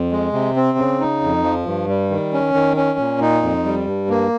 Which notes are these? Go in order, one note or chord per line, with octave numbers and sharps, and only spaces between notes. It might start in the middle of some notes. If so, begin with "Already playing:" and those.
Already playing: F2
G#3
C3
C4
C#3
D#4
F2
F3
G2
G3
D#3
C#4
D#3
C#4
A#2
D#4
F2
G3
G2
A#3